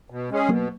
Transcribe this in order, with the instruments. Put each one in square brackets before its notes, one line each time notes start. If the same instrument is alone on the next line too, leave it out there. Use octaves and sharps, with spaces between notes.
[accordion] B2
G#3 C#4 G#4
[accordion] B2 [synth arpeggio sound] F#3 A#3